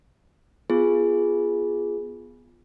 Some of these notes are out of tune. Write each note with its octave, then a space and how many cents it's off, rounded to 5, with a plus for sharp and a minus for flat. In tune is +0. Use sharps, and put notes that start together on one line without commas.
B3 +0 F4 +0 G#4 +0